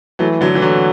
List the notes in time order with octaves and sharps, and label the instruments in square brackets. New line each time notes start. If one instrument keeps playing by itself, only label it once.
[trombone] E3 [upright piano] F#3 A3
[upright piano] D3 F#3
E3
[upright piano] D3 [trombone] F#3